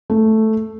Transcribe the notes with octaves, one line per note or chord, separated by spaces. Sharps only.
A3